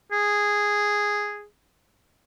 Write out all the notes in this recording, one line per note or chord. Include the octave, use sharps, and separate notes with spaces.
G#4